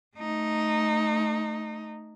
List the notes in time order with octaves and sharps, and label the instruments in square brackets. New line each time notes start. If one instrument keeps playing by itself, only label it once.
[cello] A3 D#4